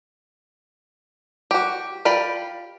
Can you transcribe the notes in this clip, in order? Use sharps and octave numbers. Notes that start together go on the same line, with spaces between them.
F#4 G4
F4 G4 D5 B5